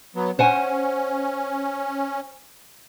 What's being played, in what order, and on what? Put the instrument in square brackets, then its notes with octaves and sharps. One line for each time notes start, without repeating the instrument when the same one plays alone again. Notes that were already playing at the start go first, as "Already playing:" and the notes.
[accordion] F#3 B3
[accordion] C#4 [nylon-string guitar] C5 F#5 G#5